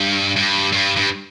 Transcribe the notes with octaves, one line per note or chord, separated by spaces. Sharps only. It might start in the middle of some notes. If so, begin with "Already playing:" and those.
Already playing: G2
G2
G2
G2